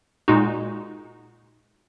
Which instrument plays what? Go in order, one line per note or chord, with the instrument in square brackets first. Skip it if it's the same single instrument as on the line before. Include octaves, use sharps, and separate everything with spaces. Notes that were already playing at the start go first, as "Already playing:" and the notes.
[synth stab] A#2 G#3 D#4 F#4